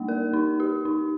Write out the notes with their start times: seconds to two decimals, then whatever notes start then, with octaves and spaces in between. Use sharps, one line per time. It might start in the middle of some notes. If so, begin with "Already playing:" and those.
Already playing: G3 A#3 D#4
0.08 A#4
0.33 D#4
0.60 G4
0.85 D#4